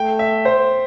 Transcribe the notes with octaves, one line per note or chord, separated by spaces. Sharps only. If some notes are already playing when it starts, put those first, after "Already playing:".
Already playing: A3 G5
E5
C5